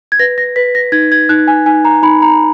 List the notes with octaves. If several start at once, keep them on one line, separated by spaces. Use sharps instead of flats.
G#6
B4 A#6
A#6
B4 B6
A#6
D#4 G#6
G#6
D#4 F#6
G#5
D#4 G#5
A#5
D#4 B5
A#5